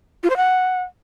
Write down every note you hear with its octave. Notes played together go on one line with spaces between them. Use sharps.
F4
C5
F#5